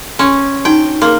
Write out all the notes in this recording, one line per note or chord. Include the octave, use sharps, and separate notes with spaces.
C#4 G#5 C6
D4 D#4 F#4 G5
A#3 G#4 C6